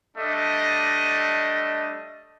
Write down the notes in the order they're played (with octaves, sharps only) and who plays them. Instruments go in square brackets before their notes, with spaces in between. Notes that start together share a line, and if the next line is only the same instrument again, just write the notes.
[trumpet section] G3 A3 D4 D#5